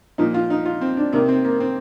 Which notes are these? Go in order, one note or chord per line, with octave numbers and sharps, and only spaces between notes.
A#2 F3 D#4
F4
D#4
F4
C4
D4
C3 D#3 A#3
C4
A#3
C4